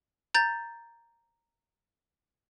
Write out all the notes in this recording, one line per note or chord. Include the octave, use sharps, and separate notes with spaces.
A#5 G6 A6